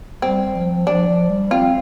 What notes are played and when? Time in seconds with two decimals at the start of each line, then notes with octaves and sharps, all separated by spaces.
0.22 G3 C4
0.55 F3
0.87 F3 D4
1.08 F3
1.29 G3
1.51 C4 F4